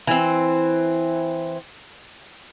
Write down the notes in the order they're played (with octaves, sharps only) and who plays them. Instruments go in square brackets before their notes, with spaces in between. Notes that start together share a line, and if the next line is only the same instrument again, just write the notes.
[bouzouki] E3 C4